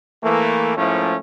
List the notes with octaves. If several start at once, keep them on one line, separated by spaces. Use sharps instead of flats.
E3 A3 A#3
G#2 F3 A3 A#3 C#4 E4